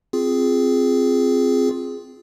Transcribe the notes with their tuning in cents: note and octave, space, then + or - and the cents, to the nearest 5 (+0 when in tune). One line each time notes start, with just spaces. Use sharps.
C4 +0 F4 +5 G#4 +0